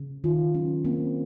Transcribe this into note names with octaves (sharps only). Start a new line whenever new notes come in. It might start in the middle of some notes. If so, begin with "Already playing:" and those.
Already playing: C#3
D#3 F4
F#3 C#4
A#3 C4